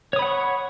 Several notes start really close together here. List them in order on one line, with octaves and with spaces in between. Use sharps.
C#5 D#6 B5 F#5 C#6